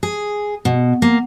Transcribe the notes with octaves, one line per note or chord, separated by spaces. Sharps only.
G#4
B2
A#3